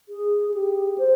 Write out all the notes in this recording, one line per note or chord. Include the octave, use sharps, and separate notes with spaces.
G#4
G4
C5